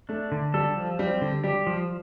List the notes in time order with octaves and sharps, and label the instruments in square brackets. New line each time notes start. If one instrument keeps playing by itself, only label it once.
[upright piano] A3 [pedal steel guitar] D4
[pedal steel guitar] D3
[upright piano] G3 [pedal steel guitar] A4
[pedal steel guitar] F3
[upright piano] G3 [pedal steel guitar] C4
[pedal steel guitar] D3
[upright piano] G3 [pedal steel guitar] G4
[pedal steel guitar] F3